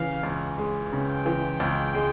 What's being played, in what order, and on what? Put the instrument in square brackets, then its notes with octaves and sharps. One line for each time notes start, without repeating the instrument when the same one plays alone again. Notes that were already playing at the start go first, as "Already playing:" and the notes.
Already playing: [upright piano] C#3 E3 [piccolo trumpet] F5
[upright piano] C#2
G#3
[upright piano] C#3 [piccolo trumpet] G5
[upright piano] E3
C#2
G#3